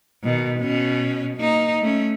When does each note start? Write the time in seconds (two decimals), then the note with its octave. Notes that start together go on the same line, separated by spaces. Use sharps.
0.23 B2 D#3
0.59 B2 C#4
1.37 A#3 D#4
1.81 A3 C#4